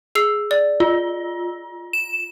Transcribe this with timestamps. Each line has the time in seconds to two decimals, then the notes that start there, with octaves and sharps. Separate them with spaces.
0.15 G#4 E6 C7
0.51 D5
0.80 F4
1.93 E7